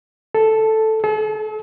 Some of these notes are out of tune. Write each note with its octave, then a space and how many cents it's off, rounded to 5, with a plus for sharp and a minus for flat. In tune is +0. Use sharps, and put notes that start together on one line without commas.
A4 +0
A4 -40